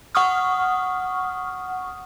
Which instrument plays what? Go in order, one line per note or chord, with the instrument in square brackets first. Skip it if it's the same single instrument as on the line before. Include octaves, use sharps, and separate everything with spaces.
[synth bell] F#5 C#6 D#6 F6